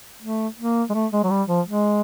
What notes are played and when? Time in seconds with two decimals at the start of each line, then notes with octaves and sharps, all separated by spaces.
0.22 A3
0.58 A#3
0.90 G#3
0.94 A3
1.12 G#3
1.24 F#3
1.30 G3
1.48 F3
1.66 G#3